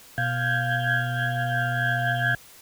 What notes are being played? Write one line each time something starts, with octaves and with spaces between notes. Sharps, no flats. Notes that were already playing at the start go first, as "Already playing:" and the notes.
B2 F5 G6 G#6